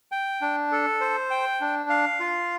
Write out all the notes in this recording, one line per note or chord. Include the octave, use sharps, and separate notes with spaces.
G5
D4
A4
C5
G5
D4
F5
F4